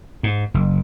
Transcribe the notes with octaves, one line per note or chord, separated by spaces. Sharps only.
G#2
F#1